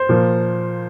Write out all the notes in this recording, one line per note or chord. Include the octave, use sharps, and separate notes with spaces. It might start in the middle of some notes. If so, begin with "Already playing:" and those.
Already playing: C5
A#2 F3